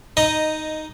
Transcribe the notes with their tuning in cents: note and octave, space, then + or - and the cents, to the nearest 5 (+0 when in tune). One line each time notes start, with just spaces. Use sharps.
D#4 +0 D#5 -10 A#5 +0